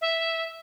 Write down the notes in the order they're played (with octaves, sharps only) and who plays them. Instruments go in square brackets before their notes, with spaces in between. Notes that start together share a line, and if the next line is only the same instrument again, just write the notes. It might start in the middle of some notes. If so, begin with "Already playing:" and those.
[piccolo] E5